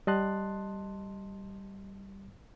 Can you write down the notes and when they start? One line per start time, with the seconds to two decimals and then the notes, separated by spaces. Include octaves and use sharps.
0.07 G3 D#5 A5 C6 F#6